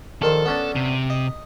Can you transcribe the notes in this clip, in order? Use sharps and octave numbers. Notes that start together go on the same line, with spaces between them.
A#1 D#3 A4 C5
B3 C#4 D4
C3
D#5